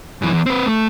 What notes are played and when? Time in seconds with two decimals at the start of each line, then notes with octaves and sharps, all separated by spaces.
0.22 F#2 E3
0.33 E2
0.46 C4 B4
0.66 A3